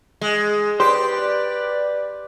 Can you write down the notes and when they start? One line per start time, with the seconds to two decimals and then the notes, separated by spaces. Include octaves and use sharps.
0.21 G#3
0.80 G4 B4 C5 D5